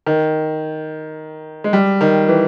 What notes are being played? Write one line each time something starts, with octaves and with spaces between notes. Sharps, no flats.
D#3
G#3
G3
D#3
E3